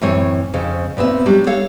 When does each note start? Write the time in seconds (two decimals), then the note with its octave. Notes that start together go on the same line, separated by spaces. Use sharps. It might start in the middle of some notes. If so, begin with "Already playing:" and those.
0.01 F#2 A2 E3 C4 C#5
0.54 F2 C#3 C4
0.97 A#2 B3 C4 E5
1.26 F#3 G3 D4
1.47 A4 C#5 F5